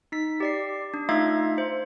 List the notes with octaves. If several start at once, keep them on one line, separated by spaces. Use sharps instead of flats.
D#4 B6
G4 D5 C7
D4
A3 D#4 F4 E5 F5 G#6
C5